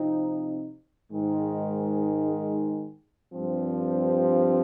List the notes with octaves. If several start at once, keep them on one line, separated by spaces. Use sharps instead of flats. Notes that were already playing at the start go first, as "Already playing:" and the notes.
Already playing: C3 F3 C4 D#4
G#2 D#3 G#3
G2 F3 C4